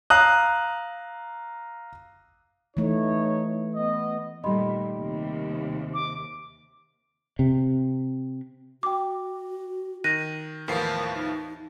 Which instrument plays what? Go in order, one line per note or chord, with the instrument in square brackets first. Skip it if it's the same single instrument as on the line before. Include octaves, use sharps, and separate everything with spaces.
[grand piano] F5 A#5 D#6 F#6
[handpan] E3 A3 [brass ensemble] D#4 C#5
[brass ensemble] B3 D#5
[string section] A#2 [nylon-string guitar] D#3 G3 A3 [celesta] D#5 B5 C6
[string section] D#2 C3
[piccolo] D6
[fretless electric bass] C3
[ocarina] F#4 [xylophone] G5 D6
[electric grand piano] D#3 [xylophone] F#6 A#6 D#7
[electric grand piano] D#2 A2 C7 [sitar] E3 F3 B3 [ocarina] A#4
[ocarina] D#4